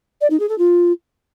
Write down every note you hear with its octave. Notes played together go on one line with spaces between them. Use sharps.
D5
D#4
G#4
A4
F4